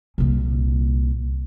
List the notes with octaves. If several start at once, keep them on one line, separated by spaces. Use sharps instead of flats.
C2 A#2